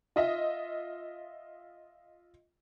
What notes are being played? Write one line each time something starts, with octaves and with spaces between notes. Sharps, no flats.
F4 D#5 E5